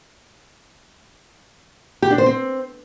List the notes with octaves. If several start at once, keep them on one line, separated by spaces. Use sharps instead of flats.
G4
D4
C5
C4